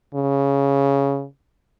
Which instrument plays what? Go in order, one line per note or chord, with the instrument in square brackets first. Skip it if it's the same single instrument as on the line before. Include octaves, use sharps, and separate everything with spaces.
[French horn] C#3